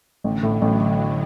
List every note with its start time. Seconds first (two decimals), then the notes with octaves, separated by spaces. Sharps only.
0.24 A1 D3
0.43 A2
0.62 A1 F#3